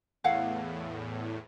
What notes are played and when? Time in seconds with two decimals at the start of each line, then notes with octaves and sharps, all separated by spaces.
0.24 E2 A2 E4 F5 F#5